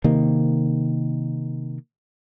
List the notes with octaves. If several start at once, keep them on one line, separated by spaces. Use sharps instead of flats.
C3 D#3 A#3